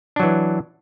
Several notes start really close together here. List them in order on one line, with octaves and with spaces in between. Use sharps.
D4 F#3 E3